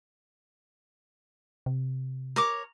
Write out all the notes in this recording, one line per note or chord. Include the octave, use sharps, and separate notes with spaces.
C3
A#4 C#5 D6